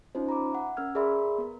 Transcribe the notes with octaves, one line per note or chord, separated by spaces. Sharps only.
C#4 D#4 F4 C5
A#5 B5 D6
E5 F#5
C#4 A#4 E6 F6 G#6
G#4 A#4 D5 E5 B5 C6
B3 A#4